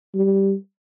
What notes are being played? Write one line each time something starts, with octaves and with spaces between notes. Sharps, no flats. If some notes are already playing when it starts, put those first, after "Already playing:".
G3